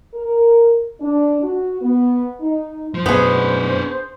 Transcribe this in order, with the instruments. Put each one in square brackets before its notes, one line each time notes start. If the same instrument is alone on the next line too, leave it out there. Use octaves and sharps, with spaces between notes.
[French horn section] A#4
D4
F#4
B3
D#4
[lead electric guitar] F3 [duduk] C5
[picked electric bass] F#2 B2 [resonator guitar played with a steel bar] B3 G#4 [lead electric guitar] D4 C#5